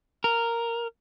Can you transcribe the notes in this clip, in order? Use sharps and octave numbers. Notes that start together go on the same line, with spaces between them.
A#4